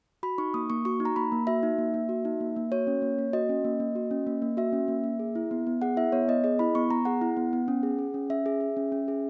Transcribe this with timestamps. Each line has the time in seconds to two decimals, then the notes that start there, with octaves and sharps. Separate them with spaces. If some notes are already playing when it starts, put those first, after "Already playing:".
0.23 F#4 B5
0.38 D#4 C#6
0.54 A#3 D#6
0.70 A#3 C#6
0.85 F#4 C#6
1.00 D#4
1.05 A#5
1.16 A#3 B5
1.32 A#3
1.47 F#4 E5
1.63 D#4
1.78 A#3
1.94 A#3
2.09 F#4
2.25 D#4
2.41 A#3
2.56 A#3
2.72 F#4 C#5
2.87 C#4
3.02 A#3
3.18 A#3
3.33 F#4 D#5
3.49 C#4
3.65 A#3
3.80 A#3
3.95 F#4
4.11 C#4
4.27 A#3
4.42 A#3
4.57 F#4 E5
4.73 C#4
4.88 A#3
5.04 A#3
5.19 G#4
5.35 E4
5.51 B3
5.67 B3
5.82 G#4 F#5
5.97 E4 E5
6.12 B3 C#5
6.28 B3 D#5
6.44 G#4 D#5
6.59 E4 B5
6.75 B3 C#6
6.90 B3 A#5
7.05 G#4 F#5
7.21 E4
7.37 B3
7.53 B3
7.68 C#4
7.83 G#4
7.99 G#4
8.14 C#4
8.30 C#4 E5
8.46 G#4
8.61 G#4
8.77 C#4
8.92 C#4
9.08 G#4